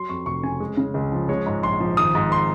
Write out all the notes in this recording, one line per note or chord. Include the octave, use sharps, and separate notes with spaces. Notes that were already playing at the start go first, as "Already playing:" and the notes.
Already playing: F#3 C6
F2 C#6
F1 C#6
C#3 G#5
G#3
C#3
C#2
F3
G#3 C#5
G#2
A#1 C6
F3
G#1 D#6
G#2
C6